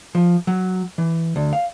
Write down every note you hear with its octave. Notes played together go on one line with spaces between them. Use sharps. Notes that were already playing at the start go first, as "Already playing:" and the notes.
F3
F#3
E3
D2
F5